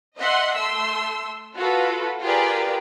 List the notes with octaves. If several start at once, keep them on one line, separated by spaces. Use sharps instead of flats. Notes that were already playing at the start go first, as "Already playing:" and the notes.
D#5 E5 F#5 C6
A3 C6 E6
F4 F#4 A4 B4
F4 G4 G#4 A#4 B4 D5